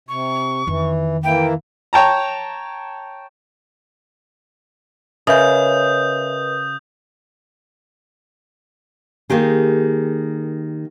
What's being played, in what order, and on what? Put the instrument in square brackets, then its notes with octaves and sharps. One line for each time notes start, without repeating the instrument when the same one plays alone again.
[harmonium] C3 [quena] C#6
[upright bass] F2 D#3 [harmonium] E3
[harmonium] E3 A#3 E4 [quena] G5
[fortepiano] C#5 G5 A5 A#5
[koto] C#3 [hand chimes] A#4 B4 D#5 [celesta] C#5 E5 [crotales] D#6 G6
[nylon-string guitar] D#3 A#3 G4 G#4